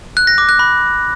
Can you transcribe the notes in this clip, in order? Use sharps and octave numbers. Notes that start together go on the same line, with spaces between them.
F#6
A#6
D6
F#6
B5